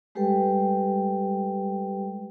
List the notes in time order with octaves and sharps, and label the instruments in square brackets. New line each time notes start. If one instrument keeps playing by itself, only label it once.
[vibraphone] G3 G#3 G4 A4 B4 G5